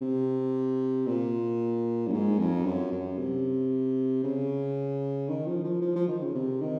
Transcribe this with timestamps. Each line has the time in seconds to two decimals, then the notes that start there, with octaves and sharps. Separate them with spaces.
0.01 C3
1.07 A#2
2.07 F#2
2.13 G#2
2.39 F2
2.65 F#2
2.92 F#2
3.18 C3
4.24 C#3
5.29 D#3
5.46 F3
5.64 F3
5.81 F3
5.95 F3
6.08 D#3
6.22 C#3
6.35 C3
6.61 D#3